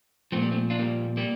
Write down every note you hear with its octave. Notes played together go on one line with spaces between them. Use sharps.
A#2 F3 A3 C4
G3 A#3
A3 C4
D4 F4
G3 A#3
G3 A#3